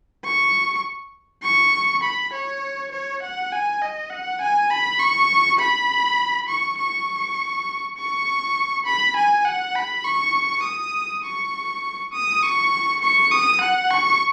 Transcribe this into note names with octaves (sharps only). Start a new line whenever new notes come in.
C#6
C#6
B5
C#5
C#5
F#5
G#5
D#5
F#5
G#5
B5
C#6
B5
C#6
C#6
C#6
B5
G#5
F#5
B5
C#6
D#6
C#6
D#6
C#6
C#6
D#6
F#5
C#6